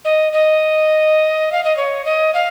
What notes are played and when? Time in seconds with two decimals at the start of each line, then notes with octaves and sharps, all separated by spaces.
0.05 D#5
0.33 D#5
1.52 F5
1.64 D#5
1.77 C#5
2.05 D#5
2.34 F5